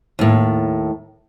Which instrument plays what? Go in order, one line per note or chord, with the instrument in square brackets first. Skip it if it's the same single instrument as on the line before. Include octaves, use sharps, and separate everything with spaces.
[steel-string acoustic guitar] D#2 A2